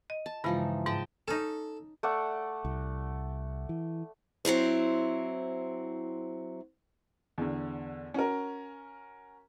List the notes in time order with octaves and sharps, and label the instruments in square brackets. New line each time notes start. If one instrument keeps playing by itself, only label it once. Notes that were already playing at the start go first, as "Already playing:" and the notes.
[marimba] D#5
[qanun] A5
[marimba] G2 C#3 G#3 [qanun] E3 F3 D#4
[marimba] G#2 [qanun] D#5 G5 A5
[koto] C#4 D#4 [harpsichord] A4
[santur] A3 D5 F#5
[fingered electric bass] C2
E3
[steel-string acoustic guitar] F#3 C4 E4 C5
[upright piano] E2 D3
C#4 F#4 A#4